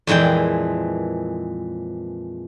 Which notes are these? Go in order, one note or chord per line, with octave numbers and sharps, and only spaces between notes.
F2 A#2 E3 G#3 G5